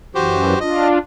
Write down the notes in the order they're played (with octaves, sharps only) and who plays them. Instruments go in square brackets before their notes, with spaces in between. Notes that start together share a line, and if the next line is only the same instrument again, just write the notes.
[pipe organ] F#2 E3 [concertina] F#4 G4 C5
[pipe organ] D4 F4 [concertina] D#5